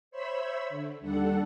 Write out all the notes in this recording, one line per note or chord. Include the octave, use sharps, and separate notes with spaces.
C5 C#5 E5 B5 E6
D3
D#2 G3 D4 A4 F#5